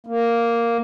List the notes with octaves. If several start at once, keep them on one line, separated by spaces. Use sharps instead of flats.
A#3